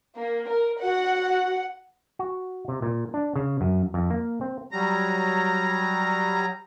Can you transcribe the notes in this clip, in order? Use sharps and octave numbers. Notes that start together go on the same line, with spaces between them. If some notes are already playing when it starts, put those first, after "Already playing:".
A#3
A#4
F#4 F#5
F#4
C3
A#2
D4
C#3
F#2
F2
A#3
C4
F#3 G3 A#5